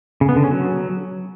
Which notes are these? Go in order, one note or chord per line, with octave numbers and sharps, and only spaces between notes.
C#3
B3
D3
C#4
F#3